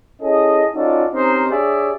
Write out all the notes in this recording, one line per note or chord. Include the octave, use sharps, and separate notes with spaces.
C#4 E4 G#4 A4 D#5
C#4 D#4 F4 F#4 A4 D5
C4 C#4 D#4 G4 A#4 C5
D4 G4 G#4 C#5 D5 E5